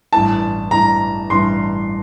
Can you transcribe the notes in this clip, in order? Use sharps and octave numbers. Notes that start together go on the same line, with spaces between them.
A1 G2 E3 A5
A1 G2 E3 A#5
A1 G2 E3 C6